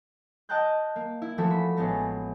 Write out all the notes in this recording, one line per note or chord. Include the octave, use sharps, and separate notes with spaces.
D#5 G5 A5 A#5 F#6 G6
A#3
E4
E3 F3 A3 C4 F#4 A4
B5
A1 G#3 A3 B3 A#6